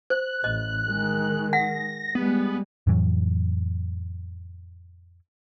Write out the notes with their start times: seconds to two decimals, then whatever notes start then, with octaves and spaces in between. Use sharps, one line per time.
0.10 C5 F#6
0.44 A1 D#5
0.88 D#3 G#3
1.53 F#5 A#6
2.15 G3 G#3 B3
2.87 F2 A2 E3 F#3